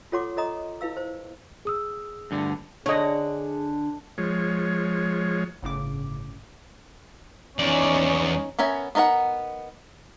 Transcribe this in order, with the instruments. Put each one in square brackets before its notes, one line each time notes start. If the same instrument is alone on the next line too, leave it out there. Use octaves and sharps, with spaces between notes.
[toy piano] F4 A4 C#5 F#5 C6 D6
A4 C#5 D#5 A#5 D#6
E4 B4 F5 E6
C5
[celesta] G#4 D#6 E6
[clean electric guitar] D2 G2 D3
[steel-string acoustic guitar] D3 [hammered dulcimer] D4 [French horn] G#4 [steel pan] C#5 D#5
[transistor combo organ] F3 G#3 C#5
[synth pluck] G1 A2 C#3 D6
[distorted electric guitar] E2 D5 [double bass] C#4 D#4
[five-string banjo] B3 C#4 A#4 E5 G#5
B3 D#4 A#4 C#5 F#5